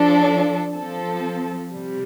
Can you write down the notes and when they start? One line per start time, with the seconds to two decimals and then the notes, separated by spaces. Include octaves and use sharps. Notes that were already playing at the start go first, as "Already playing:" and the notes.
Already playing: F3 D4 A4
0.76 F3 C4 A4
1.73 C3 G3